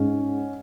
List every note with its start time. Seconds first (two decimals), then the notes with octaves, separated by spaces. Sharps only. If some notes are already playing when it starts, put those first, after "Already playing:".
Already playing: G#2 C#4